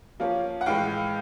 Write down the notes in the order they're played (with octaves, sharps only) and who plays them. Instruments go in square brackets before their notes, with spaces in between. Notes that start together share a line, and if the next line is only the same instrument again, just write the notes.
[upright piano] F3 A#3 C#4 F4
F#5
A2 E3 G#3 F5 G5